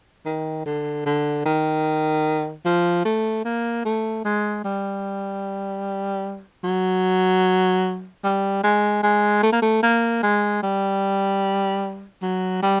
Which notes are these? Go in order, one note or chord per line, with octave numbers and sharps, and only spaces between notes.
D#3
D3
D3
D#3
F3
A3
A#3
A3
G#3
G3
F#3
G3
G#3
G#3
A3
A#3
A3
A#3
G#3
G3
F#3
G3